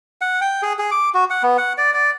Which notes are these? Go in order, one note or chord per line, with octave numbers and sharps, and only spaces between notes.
F#5
G5
G#4
G#4
D6
F#4
F#5
B3
F#5
D5
D5